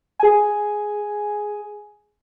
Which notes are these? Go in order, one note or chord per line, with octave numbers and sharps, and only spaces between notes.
G#4 G#5